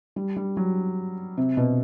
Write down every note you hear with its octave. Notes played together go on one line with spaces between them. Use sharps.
G3
G3
F#3
C3
B2